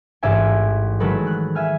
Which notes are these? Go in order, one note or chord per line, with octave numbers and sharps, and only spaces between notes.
A1 G#2 D5 E5 G#5
D#3 F#3 G#3 A4 B4
F#6
E5 G#5 F6